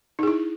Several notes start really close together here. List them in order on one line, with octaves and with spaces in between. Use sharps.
D#4 G#4 E4